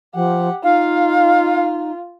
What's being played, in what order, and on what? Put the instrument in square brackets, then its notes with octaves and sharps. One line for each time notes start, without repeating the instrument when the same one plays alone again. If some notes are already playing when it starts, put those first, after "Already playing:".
[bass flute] F3 [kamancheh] G4 F#5
[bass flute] D#4 [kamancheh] F4 [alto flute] F5